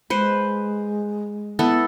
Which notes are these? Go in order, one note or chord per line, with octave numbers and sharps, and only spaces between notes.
G#3 B4 C5
B3 E4 A4